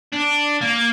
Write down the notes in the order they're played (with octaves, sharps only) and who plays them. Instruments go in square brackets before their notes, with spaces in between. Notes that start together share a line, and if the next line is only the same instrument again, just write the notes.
[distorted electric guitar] D4
A#3